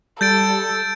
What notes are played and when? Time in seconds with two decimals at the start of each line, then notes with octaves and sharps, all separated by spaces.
0.21 G3 A4 G6 A6 D7